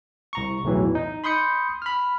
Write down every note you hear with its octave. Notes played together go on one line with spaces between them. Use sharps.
C2 A#5 C#6
B1 E2 A2 E3 F#3
D#4
B5 C6 D#6 G6 C#7
B5 F6